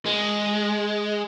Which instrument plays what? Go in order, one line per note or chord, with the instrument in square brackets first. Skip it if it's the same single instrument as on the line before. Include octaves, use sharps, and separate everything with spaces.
[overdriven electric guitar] G#3